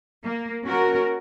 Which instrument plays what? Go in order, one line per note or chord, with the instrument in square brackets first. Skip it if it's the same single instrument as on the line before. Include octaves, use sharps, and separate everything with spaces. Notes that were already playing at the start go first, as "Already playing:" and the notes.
[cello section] A#3
C#4 F#4 A#4